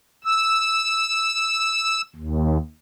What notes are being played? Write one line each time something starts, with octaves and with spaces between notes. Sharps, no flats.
E6
D#2